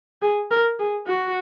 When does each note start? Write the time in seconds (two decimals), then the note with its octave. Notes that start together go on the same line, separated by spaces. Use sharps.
0.22 G#4
0.51 A#4
0.79 G#4
1.07 F#4